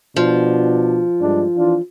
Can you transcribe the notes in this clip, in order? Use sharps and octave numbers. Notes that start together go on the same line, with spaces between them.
B2 F3 D4
G2 G#3 D4
E3 D4 F4